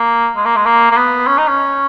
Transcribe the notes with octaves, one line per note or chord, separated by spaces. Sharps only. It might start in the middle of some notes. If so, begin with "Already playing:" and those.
Already playing: A#3
G#3
A#3
G#3
A#3
A#3
B3
C#4
D#4
C#4